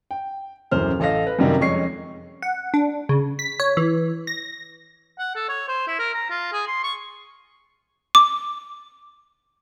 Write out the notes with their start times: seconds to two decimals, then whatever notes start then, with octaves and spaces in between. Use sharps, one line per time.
0.11 G5
0.71 D#1 F#2 E3 C5 F6
1.00 A1 A4 D#5 F5 A#6
1.27 B4
1.39 F#2 C3 D#3 G3
1.60 F2 G#3 C#4 C#6 C7
2.42 F#5
2.74 D4
3.09 C#3
3.39 B6
3.60 C#5
3.77 E3
4.27 A#6
5.19 F#5
5.35 A4
5.49 C#5
5.68 C5
5.87 E4
5.99 A#4
6.14 A#5
6.30 F4
6.53 G#4
6.67 C6
6.83 C#6
8.15 D6